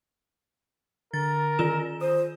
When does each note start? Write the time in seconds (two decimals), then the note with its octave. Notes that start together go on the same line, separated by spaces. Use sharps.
1.14 D3 A#4 A6
1.59 D#3 F4 E7
2.01 C5 D#6